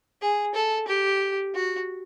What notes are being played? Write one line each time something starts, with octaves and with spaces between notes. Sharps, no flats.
G#4
A4
G4
F#4